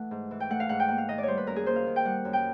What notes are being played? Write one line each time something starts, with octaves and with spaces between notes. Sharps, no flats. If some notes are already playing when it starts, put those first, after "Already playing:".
Already playing: E3 A3 F#5
G#2
E3
G5
A3 F#5
F5
G#2 F#5
G5
A#3 F#5
F5
D#3 D#5
D5
G3 C5 C#5
B4
F#2 A#4
G#4
A#3 C5
F5
D#3
G5
G3 F#5
F#2
G5